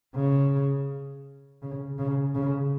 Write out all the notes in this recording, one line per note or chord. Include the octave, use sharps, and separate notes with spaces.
C#3
C#3
C#3
C#3